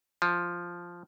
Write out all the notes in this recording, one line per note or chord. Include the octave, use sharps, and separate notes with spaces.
F3